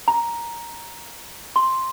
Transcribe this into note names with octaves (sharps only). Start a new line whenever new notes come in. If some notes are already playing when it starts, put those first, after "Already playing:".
A#5
C6